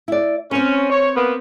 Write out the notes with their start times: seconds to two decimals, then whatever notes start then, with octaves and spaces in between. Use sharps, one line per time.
0.08 E4 D5
0.51 C4 C#4 B4
0.90 C#5
1.16 A#3 B3